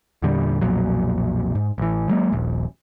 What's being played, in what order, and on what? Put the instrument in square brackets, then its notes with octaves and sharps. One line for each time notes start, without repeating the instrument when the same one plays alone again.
[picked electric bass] E2 A#2 D3 G3
B1 F2 A#2 F#3
G#2
A1 E3
F#3 G#3 A#3
D#1 A#1